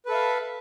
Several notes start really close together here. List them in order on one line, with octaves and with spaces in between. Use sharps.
B4 A4 E5 F5